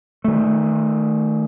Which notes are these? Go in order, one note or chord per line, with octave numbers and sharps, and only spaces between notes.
D#3 A3